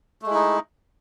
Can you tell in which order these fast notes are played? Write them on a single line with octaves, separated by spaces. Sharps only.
A3 G#3 E4 D#4